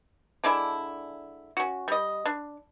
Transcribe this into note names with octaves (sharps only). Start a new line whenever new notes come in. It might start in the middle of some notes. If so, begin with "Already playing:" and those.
D3 G#3 D4 E4
C#4 F#4
G3 D#5
D4